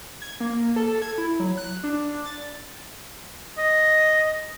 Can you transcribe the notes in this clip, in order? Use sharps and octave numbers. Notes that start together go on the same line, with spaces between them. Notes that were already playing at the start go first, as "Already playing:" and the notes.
G#6
A#3
A4
G#6
E4
F#3
F#6
D4
A6
D#5